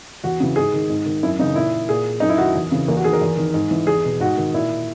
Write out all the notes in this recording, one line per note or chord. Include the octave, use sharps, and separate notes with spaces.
E2 F#4
C#3 E3
G#2 G#4
D#3
G#2
D#3
F#2 E4
C#3 E3 D#4
A#2 E4
A#2 G#4
F#2 D#4
E4
D#3 F#4
E2
C#3 E3
E2 A#3
F#4
D#3 G#4
A#4
E2
D#3
G#2
E3
E2 G#4
B2
G#2 F#4
D#3
A#2 E4